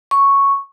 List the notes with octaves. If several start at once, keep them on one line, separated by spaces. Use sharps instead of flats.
C#6